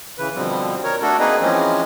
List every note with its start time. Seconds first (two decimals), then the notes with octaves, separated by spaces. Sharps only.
0.18 C#3 E3 B4
0.36 B2 D3 F3 G3 C4
0.84 A#4 C#5
1.02 A3 D4 F#4 A4
1.19 A#3 C4 D#4 G#4 B4 D#5
1.42 E3 F3 G#3 C4 C#4